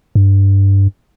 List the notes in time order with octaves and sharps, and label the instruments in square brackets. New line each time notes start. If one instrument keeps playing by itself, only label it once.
[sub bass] G2